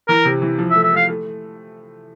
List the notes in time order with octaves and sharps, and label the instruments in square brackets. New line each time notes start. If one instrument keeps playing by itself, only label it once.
[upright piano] E3 [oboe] A#4
[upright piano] C3
E3
F3
[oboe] E5
[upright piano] A3
[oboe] E5
[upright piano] A3 [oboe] F5
[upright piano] A3